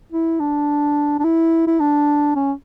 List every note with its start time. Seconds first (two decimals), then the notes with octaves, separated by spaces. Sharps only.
0.12 E4
0.40 D4
1.20 D4
1.24 E4
1.67 E4
1.80 D4
2.36 C#4